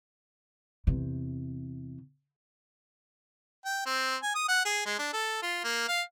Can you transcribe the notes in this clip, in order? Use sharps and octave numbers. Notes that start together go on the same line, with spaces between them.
E2 C3
G5
C4
G#5
D#6
F#5
G#4
G#3
D4
A4
F4
A#3
F5